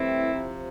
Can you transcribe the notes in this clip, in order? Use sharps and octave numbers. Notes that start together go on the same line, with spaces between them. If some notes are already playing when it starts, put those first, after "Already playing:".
Already playing: A2 E3 G3 C4 E4
C3 F3